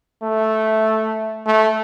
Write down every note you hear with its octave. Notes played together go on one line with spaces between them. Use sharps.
A3
A3